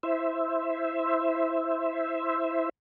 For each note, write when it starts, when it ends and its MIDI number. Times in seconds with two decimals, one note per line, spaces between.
0.03 2.69 64
0.03 2.69 72
0.03 2.69 76